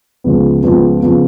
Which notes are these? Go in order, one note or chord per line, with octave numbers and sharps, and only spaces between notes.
C#2 C#3 F3 B3
C#2 C#3 F3 B3
C#3 F3 B3